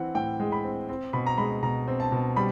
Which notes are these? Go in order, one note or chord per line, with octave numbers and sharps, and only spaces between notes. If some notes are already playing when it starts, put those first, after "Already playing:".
Already playing: E3 C4 F#5
A2 G5
G#3
B5
C4
C4
B2 B5
A#5
G#3 B5
B2 A#5
C4
A5
B2
G3 B5